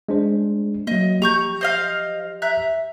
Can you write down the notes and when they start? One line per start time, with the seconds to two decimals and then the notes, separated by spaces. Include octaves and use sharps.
0.09 G#3 D4 C5
0.87 F#3 A#3 D#5
1.22 F3 G4 A#5 C#6 G6
1.61 C5 D#5 F5
2.42 E5 A#5 F#6